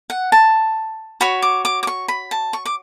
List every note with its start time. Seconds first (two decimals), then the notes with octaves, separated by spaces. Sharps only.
0.10 F#5
0.32 A5
1.21 F#4 C#5 B5
1.42 D6
1.65 D6
1.83 D6
1.87 C#6
2.08 B5
2.31 A5
2.53 C#6
2.65 D6